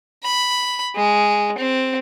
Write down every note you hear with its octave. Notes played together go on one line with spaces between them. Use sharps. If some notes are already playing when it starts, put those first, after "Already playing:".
B5
G#3
C4